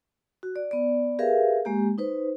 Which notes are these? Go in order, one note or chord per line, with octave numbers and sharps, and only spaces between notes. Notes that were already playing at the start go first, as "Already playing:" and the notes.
F#4
D5
B3 D5
G4 G#4 A#4 B4 E5 F5
G#3 A#3 G4
D#4 B4 C5